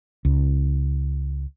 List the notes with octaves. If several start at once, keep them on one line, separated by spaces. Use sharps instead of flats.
C#2